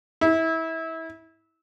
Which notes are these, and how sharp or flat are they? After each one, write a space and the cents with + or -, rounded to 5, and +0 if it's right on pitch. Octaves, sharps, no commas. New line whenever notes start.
E4 -25